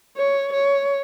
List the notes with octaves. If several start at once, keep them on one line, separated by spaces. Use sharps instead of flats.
C#5
C#5